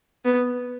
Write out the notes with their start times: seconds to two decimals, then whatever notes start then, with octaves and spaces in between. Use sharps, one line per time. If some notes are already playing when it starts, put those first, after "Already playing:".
0.25 B3